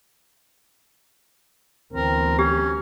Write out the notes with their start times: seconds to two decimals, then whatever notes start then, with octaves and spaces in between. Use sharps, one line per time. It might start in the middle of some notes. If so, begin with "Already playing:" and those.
1.93 D2 E3 B3 C4 A#4
2.39 C#4 G4